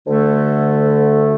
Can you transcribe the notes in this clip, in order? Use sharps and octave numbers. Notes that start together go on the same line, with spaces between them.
D2 D3 A3